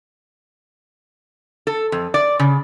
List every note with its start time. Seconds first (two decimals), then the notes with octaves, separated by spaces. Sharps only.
1.67 A4
1.92 F2
2.14 D5
2.39 C#3